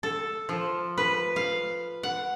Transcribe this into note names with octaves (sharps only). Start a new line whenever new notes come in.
A4
F3
B4
F5
F#5